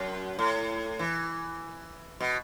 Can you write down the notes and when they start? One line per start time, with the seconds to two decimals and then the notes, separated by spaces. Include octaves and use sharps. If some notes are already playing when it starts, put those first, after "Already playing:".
Already playing: F#2
0.39 A2
0.99 E3
2.20 B2